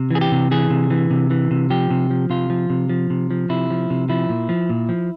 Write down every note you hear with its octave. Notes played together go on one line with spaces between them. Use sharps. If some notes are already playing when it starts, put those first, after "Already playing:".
Already playing: C3
E3 G#4
G4
C3
E3 G#4
C3
E3
C3
E3
C3
F3 G4
C3
F3
C3 F4
F3
C3
F3
C3
F3
C3 E4
F3
C3
F3 E4
A#2
F3
A#2
F3